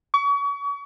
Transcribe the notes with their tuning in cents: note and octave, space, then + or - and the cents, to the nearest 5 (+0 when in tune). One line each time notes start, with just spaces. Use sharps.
C#6 +35